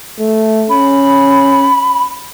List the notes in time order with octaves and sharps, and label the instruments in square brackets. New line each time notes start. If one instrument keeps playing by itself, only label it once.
[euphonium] A3
[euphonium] C#4 [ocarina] B5